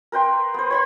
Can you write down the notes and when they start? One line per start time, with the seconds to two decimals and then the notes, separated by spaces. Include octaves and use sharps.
0.12 A#4 B4 G5 C6
0.54 B3 C5
0.70 C5 B5 C6